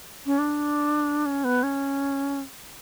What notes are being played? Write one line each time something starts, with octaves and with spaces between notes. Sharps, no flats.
C#4
D4
C#4
B3
C#4